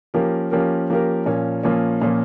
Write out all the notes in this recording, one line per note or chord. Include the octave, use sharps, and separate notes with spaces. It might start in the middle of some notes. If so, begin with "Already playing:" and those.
F3 A#3 C#4 G4 A#4
F3 A#3 C#4 G4 A#4
F3 A#3 C#4 G4 A#4
A#2 F3 A#3 C#4
A#2 F3 A#3 C#4
A#2 F3 A#3 C#4